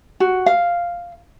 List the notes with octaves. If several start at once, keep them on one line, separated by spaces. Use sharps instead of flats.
F#4
F5